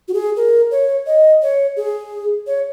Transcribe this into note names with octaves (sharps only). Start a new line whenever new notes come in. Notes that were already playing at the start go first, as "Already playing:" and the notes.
F#4
G#4
A#4
C#5
D#5
C#5
G#4
C#5